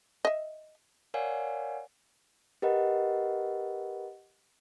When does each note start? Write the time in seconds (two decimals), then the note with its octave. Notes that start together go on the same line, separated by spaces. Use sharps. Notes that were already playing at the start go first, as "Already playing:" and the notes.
0.25 D#5 E5
1.14 A#4 C#5 D5 F5 F#5 G#5
2.62 G4 A#4 B4 D#5 F#5